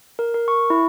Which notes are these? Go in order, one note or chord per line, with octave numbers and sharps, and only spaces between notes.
A#4
A#4
C#6
E4